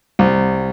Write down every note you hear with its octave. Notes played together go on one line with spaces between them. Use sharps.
C2